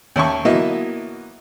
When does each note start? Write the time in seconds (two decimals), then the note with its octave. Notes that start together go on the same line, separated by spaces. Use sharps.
0.16 D#2 C#4 E5 A5 C#6
0.45 E3 F#3 A#3 B3 D#5 E5